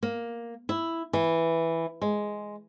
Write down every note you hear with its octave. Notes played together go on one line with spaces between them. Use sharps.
A#3
E4
E3
G#3